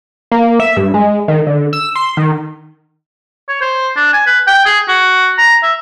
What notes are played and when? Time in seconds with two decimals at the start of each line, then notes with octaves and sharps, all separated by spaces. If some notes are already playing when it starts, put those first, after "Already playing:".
0.32 A#3
0.60 E5
0.77 G2
0.94 G#3
1.28 D#3
1.47 D3
1.73 E6
1.96 C6
2.17 D#3
3.49 C#5
3.62 C5
3.96 D4
4.13 G#5
4.27 B4
4.48 G5
4.66 G#4
4.88 F#4
5.38 A#5
5.63 E5